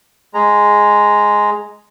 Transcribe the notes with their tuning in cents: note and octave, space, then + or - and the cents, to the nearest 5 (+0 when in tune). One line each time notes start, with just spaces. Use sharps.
G#3 +0 A#5 +0